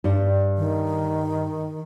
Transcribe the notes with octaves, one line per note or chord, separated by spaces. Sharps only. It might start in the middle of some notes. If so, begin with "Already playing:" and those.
G2 G3
D#3